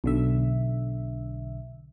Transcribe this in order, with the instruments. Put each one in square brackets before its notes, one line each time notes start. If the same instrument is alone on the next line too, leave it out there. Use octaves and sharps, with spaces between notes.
[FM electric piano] B1 D3 E5